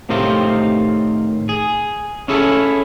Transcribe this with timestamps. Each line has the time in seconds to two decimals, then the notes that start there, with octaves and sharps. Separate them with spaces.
0.09 A2 C3 D#3 C4 F4
1.49 G#4
2.28 C#4 E4 G#4 A4